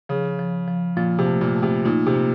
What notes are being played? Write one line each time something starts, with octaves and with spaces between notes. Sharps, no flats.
C#3 F3
F3
F3
A#2 F3
C3
A3
A#2
A3
C3
A#2 D#4
C3
A#3